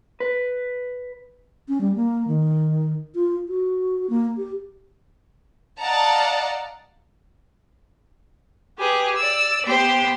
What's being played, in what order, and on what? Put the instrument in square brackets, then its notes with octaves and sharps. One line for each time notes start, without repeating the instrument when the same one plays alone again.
[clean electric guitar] B4
[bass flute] C#4
G3
A#3
D#3
F4
F#4
A#3
G4
[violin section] D5 D#5 F5 F#5 A5 A#5
[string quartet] G4 G#4 B4
D5 E6
B3 G4 C5